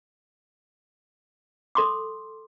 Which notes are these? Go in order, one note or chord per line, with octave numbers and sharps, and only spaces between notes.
A4 C6 D6